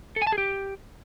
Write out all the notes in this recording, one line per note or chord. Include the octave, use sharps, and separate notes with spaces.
A4
G#5
A5
G#4
G4